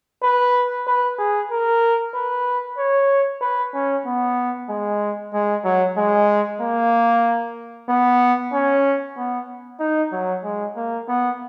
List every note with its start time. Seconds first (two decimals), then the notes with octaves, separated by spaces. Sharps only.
0.23 B4
0.87 B4
1.19 G#4
1.51 A#4
2.14 B4
2.78 C#5
3.41 B4
3.74 C#4
4.06 B3
4.69 G#3
5.33 G#3
5.65 F#3
5.97 G#3
6.61 A#3
7.89 B3
8.53 C#4
9.17 B3
9.80 D#4
10.12 F#3
10.44 G#3
10.76 A#3
11.08 B3